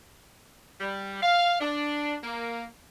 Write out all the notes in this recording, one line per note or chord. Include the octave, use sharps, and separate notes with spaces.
G3
F5
D4
A#3